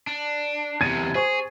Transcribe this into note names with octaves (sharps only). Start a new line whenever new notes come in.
D4
E2 C3 G#6 A6 D#7
G#4 C5 C#6